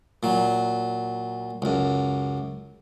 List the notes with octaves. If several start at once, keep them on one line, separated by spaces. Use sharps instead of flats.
A#2 F#3
C#2 F#2